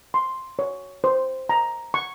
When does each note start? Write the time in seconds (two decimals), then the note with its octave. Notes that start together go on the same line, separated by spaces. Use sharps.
0.14 C6
0.59 C#5
1.04 C5
1.49 A#5
1.94 C#6